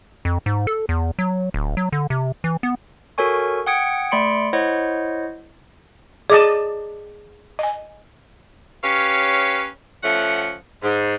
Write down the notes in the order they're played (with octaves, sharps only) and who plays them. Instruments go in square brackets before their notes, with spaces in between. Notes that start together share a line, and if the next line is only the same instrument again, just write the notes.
[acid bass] F2
G#2
A4
E2
F#3
D1
F#3
D3
C3
E3
B3
[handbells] F#4 A4 A#4 C#5 G#5 C#6
F#5 G5 D#6 G#6 C#7 D7
A3 D5 B5 C6 C#7 D7
E4 C5 C#5 D#5 F#5
[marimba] G#4 [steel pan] D5 D#5 A5
[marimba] D#5 G#5
[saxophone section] C#4 G4 B4 C#5 F5
F3 A3 C#4 F#5
G#2